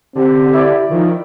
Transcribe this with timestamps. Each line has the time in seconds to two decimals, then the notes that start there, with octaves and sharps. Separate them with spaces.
0.15 D3 C4 G4
0.54 E4 D5
0.90 D#3 F3